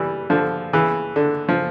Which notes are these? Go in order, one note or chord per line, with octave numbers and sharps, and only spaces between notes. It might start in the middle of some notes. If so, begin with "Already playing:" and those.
Already playing: E3 G3
D3 F3
C#3 E3
D3
F3